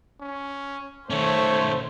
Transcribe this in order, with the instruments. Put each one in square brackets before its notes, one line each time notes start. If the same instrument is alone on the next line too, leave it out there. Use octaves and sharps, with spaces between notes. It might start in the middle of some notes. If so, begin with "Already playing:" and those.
[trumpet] C#4
[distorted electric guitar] D#3 C#4 [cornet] A3 [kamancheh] C5 [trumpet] C#5